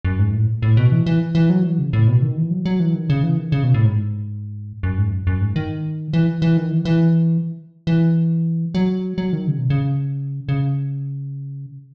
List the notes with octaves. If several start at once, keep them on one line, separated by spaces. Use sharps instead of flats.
F#2
G#2
A2
A2
B2
E3
E3
E3
F#3
E3
C#3
A2
B2
D#3
E3
F#3
F#3
E3
D#3
C#3
E3
D#3
C#3
B2
A2
G#2
F#2
G#2
F#2
F#2
G#2
D#3
E3
E3
D#3
E3
E3
E3
F#3
F#3
D#3
C#3
B2
C#3
C#3